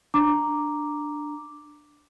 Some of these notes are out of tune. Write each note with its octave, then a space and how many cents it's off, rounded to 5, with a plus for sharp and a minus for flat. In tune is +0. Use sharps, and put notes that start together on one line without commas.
D4 +10 A#5 +0 D6 +0